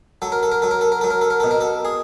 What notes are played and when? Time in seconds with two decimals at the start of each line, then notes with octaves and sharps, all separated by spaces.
0.22 F#3 A4
0.32 A#4
0.43 A4
0.52 A#4
0.62 F#3 A4
0.71 A#4
0.81 A4
0.92 A#4
1.01 F#3 A4
1.10 A#4
1.21 A4
1.30 A#4
1.40 B2 A4
1.51 A#4
1.61 A4
1.85 G#4